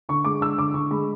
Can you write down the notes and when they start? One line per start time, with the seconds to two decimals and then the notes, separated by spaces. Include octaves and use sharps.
0.09 D3 C#6
0.24 G#3 D6
0.41 D4 E6
0.58 D3 D6
0.74 D3 C#6
0.91 G#3 B5